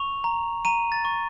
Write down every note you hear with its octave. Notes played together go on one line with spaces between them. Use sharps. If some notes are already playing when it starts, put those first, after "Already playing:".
Already playing: C#6 F7
A#5
A#5 D#7
A6
C#6